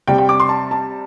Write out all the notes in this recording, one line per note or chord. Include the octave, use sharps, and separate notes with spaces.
C3 G3 C4 G5
G5
D6
C6
A5
A5